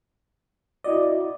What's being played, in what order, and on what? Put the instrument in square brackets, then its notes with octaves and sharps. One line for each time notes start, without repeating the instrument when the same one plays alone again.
[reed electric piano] E4 F#4 D#5 [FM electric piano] D5